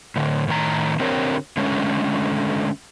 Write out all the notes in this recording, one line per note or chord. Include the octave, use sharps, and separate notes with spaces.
A2 D3
A2 D#3 A#5
D3 C4 G4 A#4 C#5
D3 G#3 A3 C#4